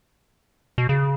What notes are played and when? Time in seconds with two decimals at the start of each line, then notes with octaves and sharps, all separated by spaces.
0.78 B2
0.89 C#3